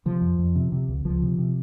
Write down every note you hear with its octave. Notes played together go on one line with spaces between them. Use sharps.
C3 F3
F2
F2
C3
C3
C#2
C#2 F3
C3
C3